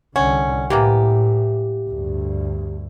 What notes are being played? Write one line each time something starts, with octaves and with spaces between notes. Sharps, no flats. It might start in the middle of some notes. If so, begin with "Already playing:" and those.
C2 D3 C#4 F#5
A2 E3 A#3 B3 G4
D2 G2